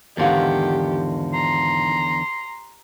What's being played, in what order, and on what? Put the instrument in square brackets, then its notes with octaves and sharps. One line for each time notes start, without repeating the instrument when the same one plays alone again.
[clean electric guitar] E2 D3 D#3 [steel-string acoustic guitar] G#2 F4 F#5 [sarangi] G4
[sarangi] A#5 [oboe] C6